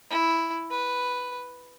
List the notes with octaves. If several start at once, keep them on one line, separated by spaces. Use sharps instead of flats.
E4
B4